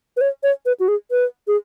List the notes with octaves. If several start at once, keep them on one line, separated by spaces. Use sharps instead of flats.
B4
C#5
C#5
B4
F#4
G#4
B4
G#4